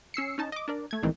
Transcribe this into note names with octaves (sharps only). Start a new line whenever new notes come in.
C#4 E6 C7 C#7
C#4 D#4 A5
D#5 D6
D4 A#4 D5
A3 G#6
C2 A2 D#3 E3 G#3 C4